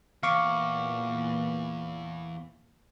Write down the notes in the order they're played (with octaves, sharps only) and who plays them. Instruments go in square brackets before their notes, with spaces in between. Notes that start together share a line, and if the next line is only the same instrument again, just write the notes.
[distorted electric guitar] E2 [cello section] A#2 E3 [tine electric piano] F5 C#6 D6